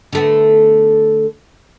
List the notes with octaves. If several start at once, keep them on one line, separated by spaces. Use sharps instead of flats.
D3 A3 B3